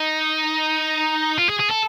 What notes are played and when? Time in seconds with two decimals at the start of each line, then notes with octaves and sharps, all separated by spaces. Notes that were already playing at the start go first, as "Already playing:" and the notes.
Already playing: D#4
1.38 F4
1.49 G#4
1.60 G#4
1.71 A4